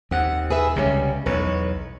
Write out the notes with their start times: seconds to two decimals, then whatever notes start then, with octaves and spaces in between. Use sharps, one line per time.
0.11 D#2 C4 F#5
0.50 G#4 B4 E5
0.76 C#2 C3 G3 C#4
1.26 B1 E2 B4 C#5